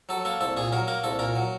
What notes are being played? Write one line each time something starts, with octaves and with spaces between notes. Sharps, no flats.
F#3 A4
A#3 A4
C2 A4
A#2 G#4
F#3 A#4
A#3 A#4
C2 A4
A#2 A#4
F#3